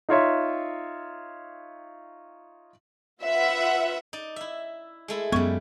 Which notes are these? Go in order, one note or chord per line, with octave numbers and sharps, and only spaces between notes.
D#4 F4 C#5 E5
F4 B4 E5 F#5
D#4 D5
E4 E5
G#3 A3 E4
F#2 C#3 G3 G#3 B3 C#6